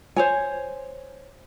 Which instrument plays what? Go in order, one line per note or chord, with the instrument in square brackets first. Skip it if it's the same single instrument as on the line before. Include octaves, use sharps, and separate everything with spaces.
[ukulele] C5 C#5 G#5